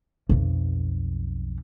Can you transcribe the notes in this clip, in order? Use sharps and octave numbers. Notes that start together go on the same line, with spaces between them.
B1 F2